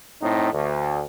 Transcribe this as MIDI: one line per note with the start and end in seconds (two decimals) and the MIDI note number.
0.22 0.52 45
0.22 0.52 60
0.22 0.52 63
0.53 1.02 38